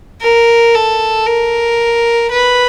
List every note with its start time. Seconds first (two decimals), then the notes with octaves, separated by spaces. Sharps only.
0.22 A#4
0.75 A4
1.26 A#4
2.31 B4